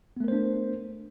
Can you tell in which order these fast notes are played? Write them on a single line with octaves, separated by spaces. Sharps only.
B3 A3 A#4 C5 D4